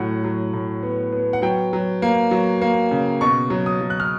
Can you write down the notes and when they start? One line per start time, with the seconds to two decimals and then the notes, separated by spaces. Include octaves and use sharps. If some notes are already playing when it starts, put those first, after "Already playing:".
Already playing: A2 F#3 F#5
0.24 F#3
0.53 A2
0.83 B3
1.12 B3
1.33 F#5
1.42 F#3 G5
1.73 F#3
2.02 A#3
2.31 F#3
2.62 A#3
2.91 C#3
3.21 B2 C#6
3.50 F#3
3.66 D#6
3.81 F#3
3.90 F#6
4.00 F6